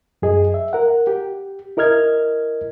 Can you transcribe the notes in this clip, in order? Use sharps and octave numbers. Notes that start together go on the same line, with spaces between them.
F#2 G#4 D#5
E5
A#4 F#5
G4
E4 A#4 D#5 F6 G#6